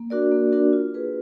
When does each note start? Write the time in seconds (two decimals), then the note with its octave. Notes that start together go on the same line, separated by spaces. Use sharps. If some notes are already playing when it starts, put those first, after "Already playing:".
Already playing: A#3
0.10 D4 F#4 A#4 D5
0.32 A#3
0.52 D4 F#4 A#4 D5
0.73 F4
0.94 G#4 B4